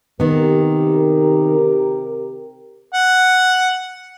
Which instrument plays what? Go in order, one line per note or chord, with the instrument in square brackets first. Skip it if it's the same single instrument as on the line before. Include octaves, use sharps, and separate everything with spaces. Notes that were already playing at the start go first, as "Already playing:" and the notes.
[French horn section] C3 G4 A#4 [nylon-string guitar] D#3 B3
[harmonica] F#5